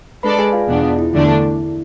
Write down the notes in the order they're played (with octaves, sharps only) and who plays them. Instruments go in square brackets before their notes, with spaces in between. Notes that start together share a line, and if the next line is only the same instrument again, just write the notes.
[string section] G#3 D4 A4 D5 [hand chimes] B4 B5
[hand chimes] G#4 G#5
F4 F5
[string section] E2 B2 B3 D4 [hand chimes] G#4
[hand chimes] F4
E4
[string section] E2 D3 A3 D4 [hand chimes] E4